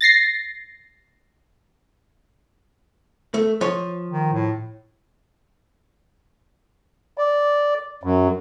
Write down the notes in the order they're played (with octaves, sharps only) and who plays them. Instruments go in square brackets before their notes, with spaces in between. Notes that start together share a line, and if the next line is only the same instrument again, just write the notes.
[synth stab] A6 A#6 C7
[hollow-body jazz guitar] A3
F3 C#5
[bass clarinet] D#3
A2
[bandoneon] D5
F#2